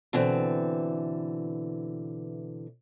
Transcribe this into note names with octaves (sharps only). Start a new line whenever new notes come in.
B2 D3 E3 C4